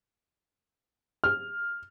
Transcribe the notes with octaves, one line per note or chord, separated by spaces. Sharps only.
F6